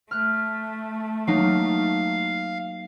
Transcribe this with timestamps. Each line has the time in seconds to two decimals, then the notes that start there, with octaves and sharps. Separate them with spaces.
0.11 A3 F6 F#6
1.27 F#3 A#3 D#4 F5